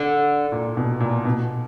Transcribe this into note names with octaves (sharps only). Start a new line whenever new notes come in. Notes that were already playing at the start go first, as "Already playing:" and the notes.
Already playing: D3
A#2
B2
A#2
B2